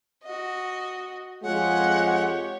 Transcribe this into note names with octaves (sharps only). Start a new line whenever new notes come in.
F#4 D#5
F2 G#3 F4 G4 C#5 F#5